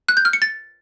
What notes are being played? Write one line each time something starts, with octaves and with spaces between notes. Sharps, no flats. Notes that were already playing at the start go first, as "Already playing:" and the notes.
F#6
G6
F6
C#7
A6